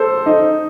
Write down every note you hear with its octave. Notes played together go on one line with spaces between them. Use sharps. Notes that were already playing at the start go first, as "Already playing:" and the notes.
Already playing: A4 C5
D#4